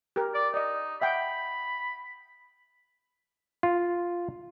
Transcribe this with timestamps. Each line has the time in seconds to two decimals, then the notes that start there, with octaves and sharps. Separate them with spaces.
0.16 G4 A#4
0.34 D5
0.54 D#4 D5 D#5
1.01 E5 F#5 G5 B5
3.63 F4